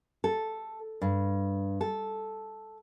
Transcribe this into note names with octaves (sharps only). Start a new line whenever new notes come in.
A4
G2
A4